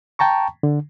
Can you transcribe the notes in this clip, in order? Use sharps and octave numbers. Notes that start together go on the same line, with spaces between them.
G5 A5 A#5 C#6
D3